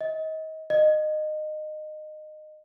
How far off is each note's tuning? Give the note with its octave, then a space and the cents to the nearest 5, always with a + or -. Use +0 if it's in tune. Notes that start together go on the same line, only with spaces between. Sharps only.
D#5 +30
D#5 -20